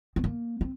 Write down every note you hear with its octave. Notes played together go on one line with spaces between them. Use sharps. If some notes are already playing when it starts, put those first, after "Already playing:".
C4
A#3
C4